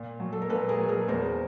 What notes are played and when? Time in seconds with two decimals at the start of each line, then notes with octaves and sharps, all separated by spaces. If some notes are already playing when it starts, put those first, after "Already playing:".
Already playing: A#2
0.20 F#3
0.32 A4
0.42 A#4
0.49 A#2 A4 B4
0.69 G#4 A#4
0.79 F#3
0.89 G#4 A#4
1.08 E2 A#4 C5